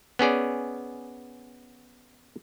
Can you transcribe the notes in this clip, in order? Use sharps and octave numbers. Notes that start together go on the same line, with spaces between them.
B3 C#4 G#4 D5